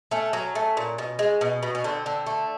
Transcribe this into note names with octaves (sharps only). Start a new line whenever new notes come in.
A3 C#4
F#3
A3
A#2
B2
G#3
B2
B2
C#4
D3 C4
D3
A3